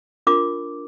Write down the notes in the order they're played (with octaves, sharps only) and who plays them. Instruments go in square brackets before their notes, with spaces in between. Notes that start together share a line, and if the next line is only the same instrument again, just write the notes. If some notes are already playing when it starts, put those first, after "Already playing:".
[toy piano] D4 F4 A#4 D6